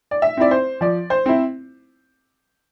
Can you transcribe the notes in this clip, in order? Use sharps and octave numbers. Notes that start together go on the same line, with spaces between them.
D5
E5
C4 E4 D5
C5
F3 D5
C5
C4 E4